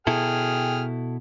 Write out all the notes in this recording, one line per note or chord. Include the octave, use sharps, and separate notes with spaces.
B2 E4 G#4 A4 G5 F6